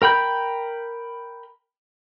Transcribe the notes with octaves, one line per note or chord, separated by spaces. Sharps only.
A#4 G5 B5 G6